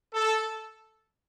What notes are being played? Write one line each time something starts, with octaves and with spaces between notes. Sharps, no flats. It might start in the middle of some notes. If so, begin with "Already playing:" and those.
A4